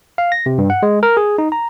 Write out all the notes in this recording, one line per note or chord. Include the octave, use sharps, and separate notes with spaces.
F5
A#6
C3
G2
F#5
G#3
A#4
G#4
D#4
A#5